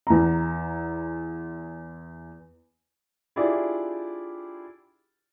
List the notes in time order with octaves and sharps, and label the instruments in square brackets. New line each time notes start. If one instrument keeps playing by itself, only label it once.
[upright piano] E2 A#5
D4 E4 F4 G4 G#4 D5